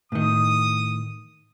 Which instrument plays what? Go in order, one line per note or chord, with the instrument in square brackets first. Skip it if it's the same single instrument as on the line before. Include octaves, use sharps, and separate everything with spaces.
[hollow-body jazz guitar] A2 D#3 [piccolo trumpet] D#6